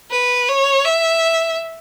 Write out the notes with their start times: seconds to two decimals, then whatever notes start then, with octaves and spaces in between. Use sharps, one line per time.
0.11 B4
0.49 C#5
0.85 E5